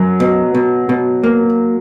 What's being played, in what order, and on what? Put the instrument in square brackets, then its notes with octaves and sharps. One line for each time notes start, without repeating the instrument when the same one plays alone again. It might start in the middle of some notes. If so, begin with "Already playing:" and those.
Already playing: [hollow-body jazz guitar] F#2 [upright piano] F#3
[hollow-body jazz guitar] B2
B2
B2
A#3